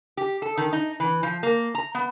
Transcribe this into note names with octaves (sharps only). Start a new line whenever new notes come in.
G4
A4
D#3
D#4
E3
F3
A#3
A#5
B3